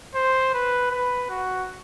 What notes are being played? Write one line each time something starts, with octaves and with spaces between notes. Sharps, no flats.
C5
B4
B4
F#4